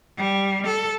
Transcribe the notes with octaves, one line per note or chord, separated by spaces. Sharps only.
G3
A4